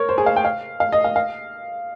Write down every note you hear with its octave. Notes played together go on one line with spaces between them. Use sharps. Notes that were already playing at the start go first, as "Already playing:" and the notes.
Already playing: A#4 C#5
C5
G#4
F5
G5
F5
F5
D#5
F5
F5